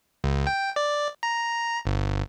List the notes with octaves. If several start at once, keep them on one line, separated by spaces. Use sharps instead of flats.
C#2
G5
D5
A#5
G1